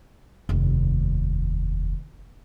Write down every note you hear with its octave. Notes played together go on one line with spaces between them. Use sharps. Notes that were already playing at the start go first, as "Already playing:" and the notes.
F1 D#2